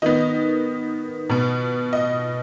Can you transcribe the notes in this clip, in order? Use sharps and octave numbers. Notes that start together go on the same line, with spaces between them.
D#3 B3 D#5
B2 B3
D#5